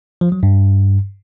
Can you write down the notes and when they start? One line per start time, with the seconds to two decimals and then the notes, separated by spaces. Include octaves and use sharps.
0.21 F3
0.32 F#3
0.43 G2